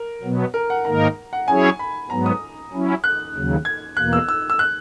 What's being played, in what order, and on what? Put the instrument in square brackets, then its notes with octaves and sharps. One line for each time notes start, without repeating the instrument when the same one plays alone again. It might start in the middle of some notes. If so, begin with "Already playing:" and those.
Already playing: [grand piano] A#4
[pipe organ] B2 F#3 B3
[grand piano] A#4
F#5
[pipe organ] G#2 D#3 A#3 D#4 A#4 [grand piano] A#5
[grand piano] F#5
[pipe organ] F#3 C#4 E4 G#4 C#5 [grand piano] G#5
[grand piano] B5
[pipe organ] G#2 F#3 B3 [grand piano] A#5
[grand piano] D#6
[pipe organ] F#3 C#4 E4
[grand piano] F#6
[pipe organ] D#2 C#3 F#3
[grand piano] G#6
[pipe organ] E2 B2 A#3 [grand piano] F#6
[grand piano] E6
E6
E6
F#6